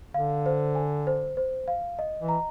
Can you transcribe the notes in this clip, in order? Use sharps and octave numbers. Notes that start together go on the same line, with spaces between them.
D3 F5
C5
G#5
C5
C5
F5
D#5
E3
A#5